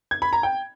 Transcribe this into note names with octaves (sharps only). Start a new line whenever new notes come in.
G#6
B5
A#5
G5